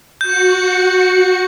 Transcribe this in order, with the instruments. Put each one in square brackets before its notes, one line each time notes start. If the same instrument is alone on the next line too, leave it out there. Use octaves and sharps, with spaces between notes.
[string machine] F#4 C#7 [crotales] G6